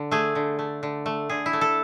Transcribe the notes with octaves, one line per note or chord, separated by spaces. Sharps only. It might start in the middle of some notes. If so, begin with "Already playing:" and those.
Already playing: D3
A3 G#4
D3
A3
D3
A3
D3 G#4
E4
A3
A4